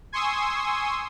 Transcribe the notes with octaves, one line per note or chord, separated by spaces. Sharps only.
G#5 C6 C#6 D#6 E6